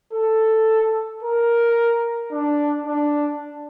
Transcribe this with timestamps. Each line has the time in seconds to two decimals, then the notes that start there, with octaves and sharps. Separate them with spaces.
0.13 A4
1.23 A#4
2.32 D4
2.86 D4